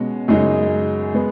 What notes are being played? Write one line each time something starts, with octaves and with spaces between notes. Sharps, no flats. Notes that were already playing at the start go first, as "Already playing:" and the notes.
Already playing: B2 G#3 C#4 F#4
F#2 C#3 G#3 D#4 F#4
G#3 B3